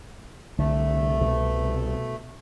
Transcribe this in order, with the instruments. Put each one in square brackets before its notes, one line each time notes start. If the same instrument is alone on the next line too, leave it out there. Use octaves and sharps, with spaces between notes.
[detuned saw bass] C2 [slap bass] D3 [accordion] A3
[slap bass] B2